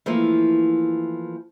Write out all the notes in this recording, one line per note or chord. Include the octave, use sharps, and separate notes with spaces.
E3 F3 A3 A#3 E4